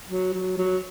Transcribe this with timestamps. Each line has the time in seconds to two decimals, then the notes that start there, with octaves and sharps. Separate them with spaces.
0.09 F#3
0.34 F#3
0.58 F#3